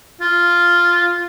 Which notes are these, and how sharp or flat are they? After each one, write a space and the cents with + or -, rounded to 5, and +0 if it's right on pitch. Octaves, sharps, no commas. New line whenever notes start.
F4 -5